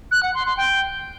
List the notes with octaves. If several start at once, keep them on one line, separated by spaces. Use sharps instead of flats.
F#6
F#5
C6
C6
G5